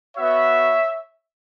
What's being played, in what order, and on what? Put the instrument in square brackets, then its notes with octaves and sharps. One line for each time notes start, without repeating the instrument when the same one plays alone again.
[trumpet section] B3 F#4 C#5 E5